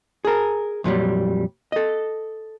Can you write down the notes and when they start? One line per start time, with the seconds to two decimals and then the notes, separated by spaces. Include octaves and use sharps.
0.25 G#4 A#4
0.84 F2 A#2 F#3 G3
1.72 A4 D#5